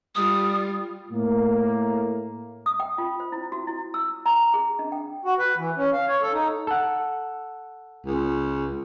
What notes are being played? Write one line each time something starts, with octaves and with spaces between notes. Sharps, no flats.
G3 F4 D#6
A2 A#3
D#6
G5
F4
C5
E4
F#4
E4
E6
A#5
G#4
D4
G5
F#4
B4
E3
C#4
F5
C#5
A4
D#4
A4 F#5
C#2